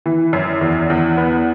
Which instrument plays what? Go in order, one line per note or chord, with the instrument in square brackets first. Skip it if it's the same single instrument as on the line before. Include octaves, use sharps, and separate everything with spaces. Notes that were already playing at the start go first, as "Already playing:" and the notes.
[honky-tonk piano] E3
F#2
E2
E2
B3